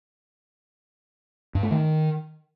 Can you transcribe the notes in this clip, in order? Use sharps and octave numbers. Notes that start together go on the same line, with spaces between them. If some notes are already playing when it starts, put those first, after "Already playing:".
G2
A3
D#3